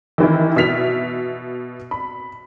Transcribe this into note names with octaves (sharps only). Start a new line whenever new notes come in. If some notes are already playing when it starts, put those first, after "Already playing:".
D#3 E3 E4
B2 E5 F6 B6 F7
B5